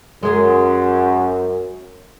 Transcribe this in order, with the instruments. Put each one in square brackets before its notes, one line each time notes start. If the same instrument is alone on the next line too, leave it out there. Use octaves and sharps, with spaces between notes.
[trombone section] F#2 [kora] G#3 G#4